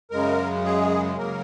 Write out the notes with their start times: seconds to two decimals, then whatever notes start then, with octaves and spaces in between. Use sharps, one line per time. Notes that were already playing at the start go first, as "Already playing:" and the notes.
0.11 F#2 C#3 G#3 A#4
0.65 G#4
1.18 C#3 F#3 A#3 A#4